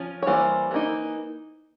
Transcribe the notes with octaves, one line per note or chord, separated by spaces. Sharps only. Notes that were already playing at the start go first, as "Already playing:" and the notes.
Already playing: F3 C#4
C#5
E3 G3 A#3 C5
E3 G3 A#3 D#4